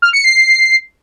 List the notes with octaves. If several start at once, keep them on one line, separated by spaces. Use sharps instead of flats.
F6
C#7
C7